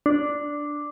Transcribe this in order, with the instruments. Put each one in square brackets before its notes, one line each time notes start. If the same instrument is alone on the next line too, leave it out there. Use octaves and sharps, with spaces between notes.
[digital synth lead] D4